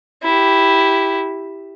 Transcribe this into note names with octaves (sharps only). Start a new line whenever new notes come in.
E4 G4